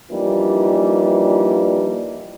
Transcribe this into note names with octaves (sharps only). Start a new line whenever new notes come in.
E3 F3 G3 A#3 D4 D#4